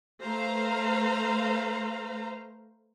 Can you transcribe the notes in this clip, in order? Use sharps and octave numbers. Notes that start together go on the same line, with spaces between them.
A3 B4 C5 F5 A#5